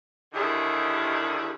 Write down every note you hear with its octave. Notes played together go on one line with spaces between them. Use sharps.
D#2 D3 D#3 G3 E4 G#4